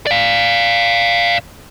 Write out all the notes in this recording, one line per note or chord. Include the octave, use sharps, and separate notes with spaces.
D5 F5